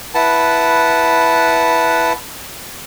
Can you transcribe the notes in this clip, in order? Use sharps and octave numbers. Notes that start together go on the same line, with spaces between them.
E4 B4 F#5 A5